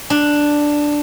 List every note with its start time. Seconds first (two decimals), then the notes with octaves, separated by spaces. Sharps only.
0.10 D4